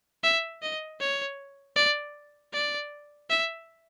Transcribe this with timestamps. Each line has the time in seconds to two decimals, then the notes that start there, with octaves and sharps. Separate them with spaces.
0.24 E5
0.62 D#5
1.00 C#5
1.76 D5
2.53 D5
3.30 E5